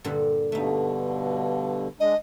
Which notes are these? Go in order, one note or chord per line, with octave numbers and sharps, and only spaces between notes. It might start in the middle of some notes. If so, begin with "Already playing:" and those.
G2 A#2 D3
G2 B2 D3 A3 D#4
G#3 D4 D#5